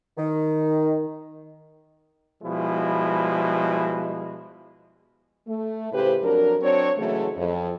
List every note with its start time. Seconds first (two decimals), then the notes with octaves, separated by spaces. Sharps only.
0.18 D#3
2.44 B2 F3 G3 G#3 E4
5.47 A3
5.92 A2 C#3 G4 B4 C5
6.22 F2 F#3 D4 A#4
6.61 F#3 C4 D4 C#5
6.98 C#3 E3 F#3 G#3 A3
7.36 F2